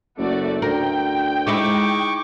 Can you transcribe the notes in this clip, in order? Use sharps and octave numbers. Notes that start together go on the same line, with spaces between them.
F#1 A3 F#4 D5
D2 A#4 G5
G#3 D#4 E4 C#6 D6